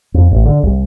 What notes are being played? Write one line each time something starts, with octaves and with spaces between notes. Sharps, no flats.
F2
A1
D3
C2